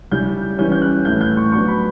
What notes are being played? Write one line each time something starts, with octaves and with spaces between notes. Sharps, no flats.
C#3 G3 C#4 E4 G6
E3 G3 C#4 E4 G6
G6
F#6
A2 E3 A3 G6
G6
C#6
F#3 B3 D4 C#6
B5